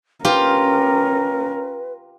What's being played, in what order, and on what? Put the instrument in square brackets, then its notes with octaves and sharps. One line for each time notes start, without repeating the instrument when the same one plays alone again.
[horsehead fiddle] C#4 A#4 [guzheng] F4 G4 [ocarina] B4